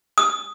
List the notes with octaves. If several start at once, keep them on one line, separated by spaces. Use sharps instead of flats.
D#6